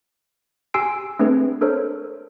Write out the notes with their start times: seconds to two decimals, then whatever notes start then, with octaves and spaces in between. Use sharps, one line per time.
0.74 G4 G#5 C6 E6 C7 D7
1.19 A3 C4 D4 G#4 B4
1.61 D4 A4 A#4 C5 C#5